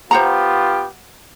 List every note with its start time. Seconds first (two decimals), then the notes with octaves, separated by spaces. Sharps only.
0.11 B3 F4 G4 C5 F#5 A#5